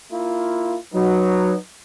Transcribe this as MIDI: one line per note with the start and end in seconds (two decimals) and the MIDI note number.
0.12 0.77 58
0.12 0.77 64
0.12 0.77 65
0.94 1.53 54
0.94 1.57 63
0.94 1.57 71